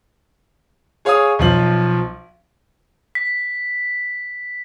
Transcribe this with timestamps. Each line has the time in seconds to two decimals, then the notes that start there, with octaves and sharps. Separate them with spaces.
1.05 G#4 C#5 F5 G#5 D#6
1.39 B1 F3 F#7
3.15 B6